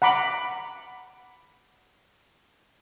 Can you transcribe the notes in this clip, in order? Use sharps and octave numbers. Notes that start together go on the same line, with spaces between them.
F#5 A#5 B5 D6